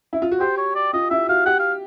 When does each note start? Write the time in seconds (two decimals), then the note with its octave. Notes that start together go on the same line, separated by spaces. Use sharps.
0.13 E4
0.22 F4
0.31 F#4
0.40 G4 C5
0.58 C#5
0.75 D5
0.93 F4 D#5
1.10 E4 E5
1.28 F#4 F5
1.46 G4 F#5
1.59 F5